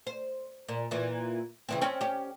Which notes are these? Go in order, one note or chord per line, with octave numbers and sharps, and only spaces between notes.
C5
A#2
A#2 E3
C#3 E3 C4
C4 C#4
C#4 G4